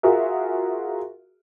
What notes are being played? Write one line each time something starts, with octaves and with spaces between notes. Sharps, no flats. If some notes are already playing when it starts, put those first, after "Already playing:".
F4 F#4 G#4 A#4 E5